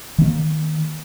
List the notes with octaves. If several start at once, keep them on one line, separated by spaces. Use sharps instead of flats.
D#3 A#3